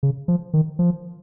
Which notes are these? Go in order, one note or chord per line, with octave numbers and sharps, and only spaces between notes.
C#3
F3
D#3
F3